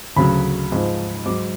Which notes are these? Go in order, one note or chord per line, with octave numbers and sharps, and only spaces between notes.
D2 C#3 F#3 B5
G#2 F3
G#2 F#3 D6